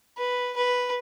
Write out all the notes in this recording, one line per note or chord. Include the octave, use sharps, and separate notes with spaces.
B4
B4